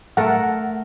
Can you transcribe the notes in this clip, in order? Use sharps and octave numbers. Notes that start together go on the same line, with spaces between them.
A3 A4 A#4 F#5